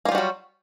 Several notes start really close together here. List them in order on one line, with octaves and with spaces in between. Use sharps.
A#3 F4 G3 F#4 F#3